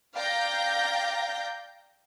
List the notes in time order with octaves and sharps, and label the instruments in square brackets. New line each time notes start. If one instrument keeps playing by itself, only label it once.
[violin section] D5 F5 G5 A#5 G6 A#6